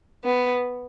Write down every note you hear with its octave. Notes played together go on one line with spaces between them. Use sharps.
B3